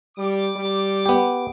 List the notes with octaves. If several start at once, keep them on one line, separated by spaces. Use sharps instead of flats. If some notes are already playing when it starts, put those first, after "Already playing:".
G3 D6
G3
B3 G4